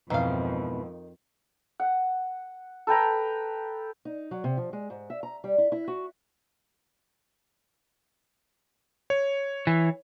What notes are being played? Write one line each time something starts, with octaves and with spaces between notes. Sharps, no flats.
F2 G#2 B2 D#3 E3 F5
F#5
A4 B4 G5 A#5
D#4
F#3
C3
F3
G#3
G#2
E5
A#5
G3
E4
E4
F#4
C#5
E3